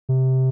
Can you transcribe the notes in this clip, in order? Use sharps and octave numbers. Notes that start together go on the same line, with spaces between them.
C3